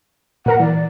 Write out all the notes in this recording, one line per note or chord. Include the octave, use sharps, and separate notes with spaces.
A#2 A#4 F#5 A#5
E3 D5